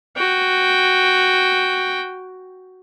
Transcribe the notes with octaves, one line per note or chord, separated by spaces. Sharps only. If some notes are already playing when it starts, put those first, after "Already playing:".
F#4 G5